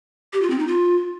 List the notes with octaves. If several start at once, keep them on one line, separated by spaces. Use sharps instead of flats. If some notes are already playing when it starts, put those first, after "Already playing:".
G4
F4
C4
D#4
F4